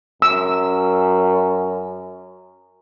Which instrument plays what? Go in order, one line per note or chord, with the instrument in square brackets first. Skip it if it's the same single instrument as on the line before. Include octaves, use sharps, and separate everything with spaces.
[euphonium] F#2 [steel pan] E6